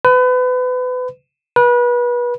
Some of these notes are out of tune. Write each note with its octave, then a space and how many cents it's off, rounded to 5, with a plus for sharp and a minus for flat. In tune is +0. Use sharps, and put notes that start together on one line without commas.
B4 +30
B4 -30